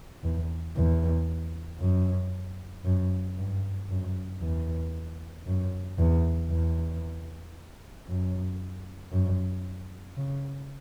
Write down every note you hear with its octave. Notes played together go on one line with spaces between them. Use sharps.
E2
E2
F#2
F#2
G2
F#2
E2
F#2
E2
E2
F#2
F#2
C#3